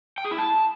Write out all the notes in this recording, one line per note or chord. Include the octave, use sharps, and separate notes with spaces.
G5
G#4
E4
A5